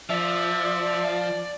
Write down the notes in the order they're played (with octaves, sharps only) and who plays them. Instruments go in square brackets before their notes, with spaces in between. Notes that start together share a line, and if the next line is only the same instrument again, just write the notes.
[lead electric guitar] F3 [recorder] D5 [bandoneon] E5